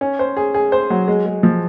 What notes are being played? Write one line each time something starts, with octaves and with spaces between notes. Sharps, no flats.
C#4
C5
G#4
G#4
C5
F#3
G#3
G#3
F3